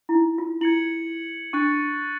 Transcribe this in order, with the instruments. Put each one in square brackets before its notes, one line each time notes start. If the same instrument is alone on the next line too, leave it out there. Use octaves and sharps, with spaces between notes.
[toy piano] E4
D#4
F4
[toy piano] E4 [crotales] G#6 C#7 F#7
[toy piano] D4 [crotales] C#6 F#6 A6 C#7